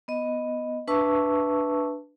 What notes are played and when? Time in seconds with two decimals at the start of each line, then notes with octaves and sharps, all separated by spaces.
0.08 B3 D#5
0.88 D4 B4 E5 A5 C#6 E6